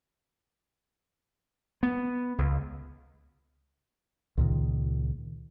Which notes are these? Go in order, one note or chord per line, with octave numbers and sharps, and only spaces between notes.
B3
C#2
C#2 A#2 D#3